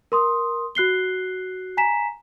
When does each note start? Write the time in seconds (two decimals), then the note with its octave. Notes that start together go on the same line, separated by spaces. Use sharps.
0.12 A#4 C6 D#6
0.75 F#4 F#6 C7 G7
1.77 G#5 A#5 B6 E7